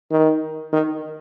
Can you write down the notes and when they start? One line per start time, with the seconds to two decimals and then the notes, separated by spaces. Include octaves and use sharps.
0.11 D#3
0.72 D#3